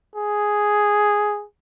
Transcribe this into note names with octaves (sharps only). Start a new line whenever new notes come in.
G#4